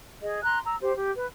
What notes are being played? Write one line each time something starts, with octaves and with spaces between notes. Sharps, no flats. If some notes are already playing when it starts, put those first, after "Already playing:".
G#4 D#5
A#5 C6 F#6
A#5 E6
G4 C5
G4
B4